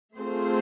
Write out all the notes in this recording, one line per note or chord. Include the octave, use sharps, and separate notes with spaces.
A3 C4 F4 G#4 C5